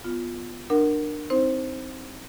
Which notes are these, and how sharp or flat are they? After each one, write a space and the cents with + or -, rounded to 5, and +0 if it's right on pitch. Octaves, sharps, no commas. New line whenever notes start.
B3 +0 F4 +0
D4 +25 A#4 +0 F#5 +15
C4 +0 D#4 +35 C5 +10